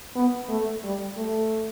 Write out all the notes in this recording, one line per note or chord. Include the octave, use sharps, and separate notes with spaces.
B3
A3
G3
A3